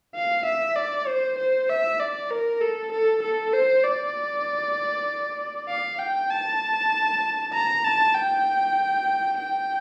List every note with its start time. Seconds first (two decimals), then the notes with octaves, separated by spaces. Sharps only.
0.15 F5
0.45 E5
0.76 D5
1.07 C5
1.38 C5
1.69 E5
1.99 D5
2.30 A#4
2.61 A4
2.92 A4
3.22 A4
3.53 C5
3.83 D5
5.68 F5
5.99 G5
6.30 A5
7.54 A#5
7.84 A5
8.14 G5
9.38 G5